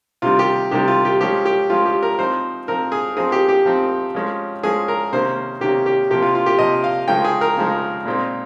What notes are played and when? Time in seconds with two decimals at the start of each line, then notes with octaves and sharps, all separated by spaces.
0.22 C3 D#3 G3 F4
0.39 G4
0.71 C3 D#3 G3 G4
0.88 F4
1.05 G4
1.21 F3 G#3 C#4 G4
1.45 G4
1.70 F3 G#3 C#4 F4
1.86 G4
2.03 A#4
2.18 F3 C4 D#4 C5
2.68 F3 C4 D#4 A#4
2.92 G#4
3.17 F3 C4 D#4 G#4
3.32 G4
3.48 G4
3.66 F3 C4 D#4
4.15 F3 G#3 C#4
4.63 F3 G#3 C#4 G#4
4.88 A#4
5.12 C3 D#3 A#3 C#4 C5
5.61 C3 D#3 A#3 C#4 G4
5.86 G4
6.10 C3 F3 A#3 G4
6.22 F4
6.35 F4
6.46 G4
6.59 C3 F3 A#3 D#5
6.84 F5
7.08 C#3 F3 G#3 D#4 G5
7.24 G#4
7.41 A#4
7.58 C#3 F3 G#3 D#4
8.05 A#2 G#3 C4 D#4